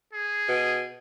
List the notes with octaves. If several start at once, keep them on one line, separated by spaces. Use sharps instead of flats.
G#4
B2